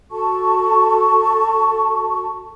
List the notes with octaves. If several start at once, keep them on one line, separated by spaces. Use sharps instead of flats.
F#4 A4 A5 C#6